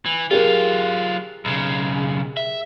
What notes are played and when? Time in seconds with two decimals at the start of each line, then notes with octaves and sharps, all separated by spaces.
0.06 E3
0.31 F#3 F4 G4 G#4 A#4
1.45 B1 C#3
2.37 E5